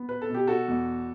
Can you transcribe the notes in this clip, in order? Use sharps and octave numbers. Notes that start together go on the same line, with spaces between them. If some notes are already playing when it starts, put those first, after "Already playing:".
Already playing: B3
B4
A4
B2 G4
F#4 A4
E2